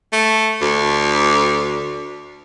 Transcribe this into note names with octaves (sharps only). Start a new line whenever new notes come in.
A3
D2